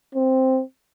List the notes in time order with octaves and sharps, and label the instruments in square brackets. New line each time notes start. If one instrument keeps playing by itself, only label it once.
[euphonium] C4